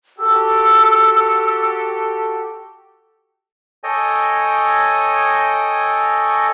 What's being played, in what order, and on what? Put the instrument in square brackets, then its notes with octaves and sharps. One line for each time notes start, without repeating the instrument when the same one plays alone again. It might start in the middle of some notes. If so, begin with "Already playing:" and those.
[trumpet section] F#4 G4 A4 [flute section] E6
[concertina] A4 C#5 D#5 G5 G#5